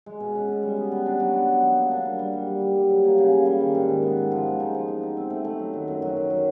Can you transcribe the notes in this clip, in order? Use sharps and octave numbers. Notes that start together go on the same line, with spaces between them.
G#3
B2
C#4
B2
G3
B3
B3
D4
F#3
B3
B3
F#3
A#3
D4
G3
G3
G3
G3
G3
G3
F#3
A#3
C#3
C#3
G3
D#3
G#2
D#3
B3
G#2
F3
G#3
D#4
F3
D#4
D#4
C4
A3
A3
F#3
D#3
F#2
F#3
F#3
F#3